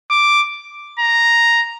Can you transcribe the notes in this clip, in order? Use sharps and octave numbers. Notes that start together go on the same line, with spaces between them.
D6
A#5